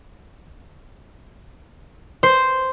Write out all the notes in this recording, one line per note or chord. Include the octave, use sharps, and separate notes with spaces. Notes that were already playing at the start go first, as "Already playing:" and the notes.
C5